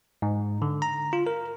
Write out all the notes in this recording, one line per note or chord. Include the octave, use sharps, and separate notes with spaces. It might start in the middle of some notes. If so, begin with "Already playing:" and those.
G#2
D3
A#5
F4
A#4